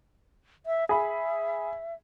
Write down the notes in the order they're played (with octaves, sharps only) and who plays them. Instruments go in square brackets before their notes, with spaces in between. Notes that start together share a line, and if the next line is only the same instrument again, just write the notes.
[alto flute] E5
[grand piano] G#4 B5 [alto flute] E5